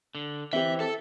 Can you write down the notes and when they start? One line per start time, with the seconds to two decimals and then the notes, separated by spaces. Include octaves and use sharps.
0.15 D3
0.53 E3 C4 G4 E5
0.80 A4